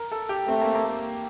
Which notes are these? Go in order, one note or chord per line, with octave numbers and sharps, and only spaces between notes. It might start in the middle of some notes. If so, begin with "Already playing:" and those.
Already playing: A#4
A4
G4
A3 C4
A#3
A#3